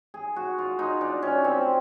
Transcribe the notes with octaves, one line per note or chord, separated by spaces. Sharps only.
G#4
F#4
F4
D#4
D4
C#4
C4